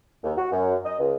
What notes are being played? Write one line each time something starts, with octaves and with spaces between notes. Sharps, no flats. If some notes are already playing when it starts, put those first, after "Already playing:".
D#2
F#4
F#2
D#5
C#2